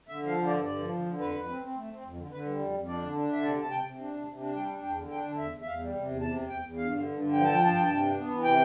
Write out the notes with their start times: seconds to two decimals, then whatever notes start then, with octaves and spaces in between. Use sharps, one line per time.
0.09 D3 E5
0.23 F3 F5
0.37 D3
0.47 D5
0.51 G2
0.65 D3 D5
0.79 F3
0.93 D3
1.06 D3
1.20 F2 B4
1.34 F2
1.49 C4
1.62 C4
1.76 A3
1.90 C4
2.05 F2
2.18 D3
2.31 D3 B4
2.46 G3
2.59 F2
2.74 F2
2.87 D4 D5
3.02 D3
3.15 D4
3.29 D3 E5
3.43 C3 D5
3.57 C3
3.63 A5
3.71 C3 G5
3.85 C3
3.99 D4
4.13 C3
4.27 C3
4.40 D4
4.54 G3 G5
4.69 D4
4.82 E2 G5
4.96 D3
5.10 D4 G5
5.24 D3
5.38 E2 E5
5.52 E2
5.62 E5
5.66 E2 F5
5.79 G3
5.94 C3
6.07 E2
6.21 C3 A5
6.36 E2
6.49 E2 G5
6.64 E2
6.77 G2 F5
6.92 D3
7.06 G2
7.19 D3
7.33 F3 G5
7.44 F3 A5
7.53 G5
7.61 G2 A5
7.73 G2 G5
7.83 C3 A5
7.94 G5
8.03 D4
8.17 B3
8.30 E3
8.44 C3 G5